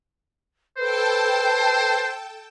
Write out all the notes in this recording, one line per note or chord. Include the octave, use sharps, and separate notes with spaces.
A4 B4 C5 G5 A5